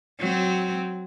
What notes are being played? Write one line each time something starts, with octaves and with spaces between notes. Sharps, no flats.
F#3 C4